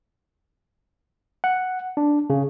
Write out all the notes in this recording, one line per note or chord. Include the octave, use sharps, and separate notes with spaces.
F#5
D4
C#3